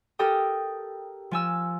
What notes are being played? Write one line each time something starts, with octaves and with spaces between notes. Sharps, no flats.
G4 A4 A#4 G5 D#6
F3 G#5 E6